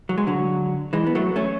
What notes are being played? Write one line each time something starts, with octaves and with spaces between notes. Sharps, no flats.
F#3
G#3
D3 F#3
E3 G#3
B3
F#3 A3
A3 C#4